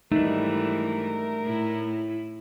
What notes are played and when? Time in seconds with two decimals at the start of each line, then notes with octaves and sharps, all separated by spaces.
0.12 G#2 E3 G3 A3 D4 D#4 A#4
1.43 A2 E4